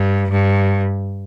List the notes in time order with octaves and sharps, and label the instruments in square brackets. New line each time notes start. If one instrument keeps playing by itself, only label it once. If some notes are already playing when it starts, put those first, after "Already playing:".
Already playing: [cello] G2
G2